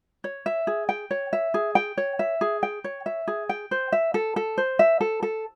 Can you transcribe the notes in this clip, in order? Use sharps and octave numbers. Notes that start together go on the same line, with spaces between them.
C#5
E5
G#4
G5
C#5
E5
G#4
G5
C#5
E5
G#4
G5
C#5
E5
G#4
G5
C5
E5
A4
A4
C5
E5
A4
A4